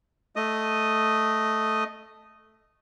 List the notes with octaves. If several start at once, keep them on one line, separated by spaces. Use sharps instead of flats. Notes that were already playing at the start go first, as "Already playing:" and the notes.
A3 D#5 D#6